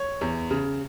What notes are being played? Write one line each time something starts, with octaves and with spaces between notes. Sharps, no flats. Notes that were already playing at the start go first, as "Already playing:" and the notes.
Already playing: C#5
E2
C#3